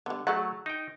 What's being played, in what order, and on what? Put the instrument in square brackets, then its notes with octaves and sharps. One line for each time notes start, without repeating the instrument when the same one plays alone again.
[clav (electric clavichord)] D3 [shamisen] G3 B3
[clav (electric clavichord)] F#3 A3 [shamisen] G#4 D5 F#5
[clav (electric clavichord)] D#4 G5